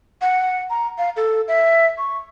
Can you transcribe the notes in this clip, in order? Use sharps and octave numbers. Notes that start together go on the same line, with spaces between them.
F#5
A#5
F5
A4
E5
C#6